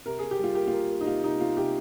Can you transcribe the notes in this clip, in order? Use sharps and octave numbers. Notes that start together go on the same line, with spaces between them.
C3 A#4
G#4
C3
G4
G3 F4
A#3 G4
F4
A#3
A#3
D#4
C3 F4
C3 D#4
C3 F4
C3 G4